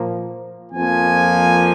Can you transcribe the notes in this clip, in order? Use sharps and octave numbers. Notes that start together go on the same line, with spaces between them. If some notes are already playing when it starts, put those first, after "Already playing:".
Already playing: A#2 F3 A#3
F2 F3 A#3 G#5